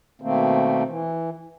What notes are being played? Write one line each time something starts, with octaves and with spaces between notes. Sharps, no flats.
B2 D#3 A3 A#3 C4
E3